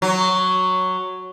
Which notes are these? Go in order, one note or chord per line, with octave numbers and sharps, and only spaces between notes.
F#3